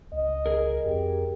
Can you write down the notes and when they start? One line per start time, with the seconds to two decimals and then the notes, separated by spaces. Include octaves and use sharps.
0.13 C#2 D#5
0.46 G#4 A#4
0.86 F2 G4